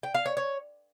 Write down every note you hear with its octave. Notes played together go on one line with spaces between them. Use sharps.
G5
F5
C#5
C#5